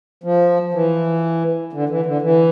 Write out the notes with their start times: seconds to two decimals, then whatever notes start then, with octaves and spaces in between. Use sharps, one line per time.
0.24 F3
0.74 E3
1.73 D3
1.89 E3
2.06 D3
2.22 E3